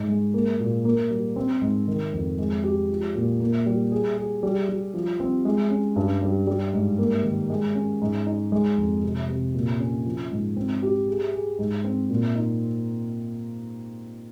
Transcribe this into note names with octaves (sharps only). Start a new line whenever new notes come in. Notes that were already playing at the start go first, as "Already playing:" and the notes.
Already playing: G#2
G#3
A#3
A#2
A#3
G3
C4
G#2
D#3
F2
G#3
G4
F3
A#2
A#3
G3
G#4
G#4
G3
G3
F3
C4
G#3
C#4
G2
G3
G3
G#2
A#3
D#3
G#3
C#4
G#2
D#4
G#3
F2
C3
C3
A#2
C#4
F3
G#2
C4
G4
G#4
G#4
G#2
C4
A#2
D#4